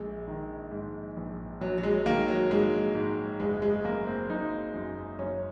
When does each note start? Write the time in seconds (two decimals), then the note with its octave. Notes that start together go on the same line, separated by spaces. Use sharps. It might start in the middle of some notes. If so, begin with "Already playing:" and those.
Already playing: A#1 G#3
0.28 D#3
0.71 G#2
1.17 A#1
1.61 A#1 F#3
1.78 F#3
1.83 G#3
2.06 D#3 A#3
2.28 F#3
2.51 G#2 G#3
2.95 G#2
3.40 F#1 G#3
3.62 G#3
3.84 F#2 A#3
4.07 C4
4.29 F#2 D#4
4.74 F#2
5.19 F#2 C#4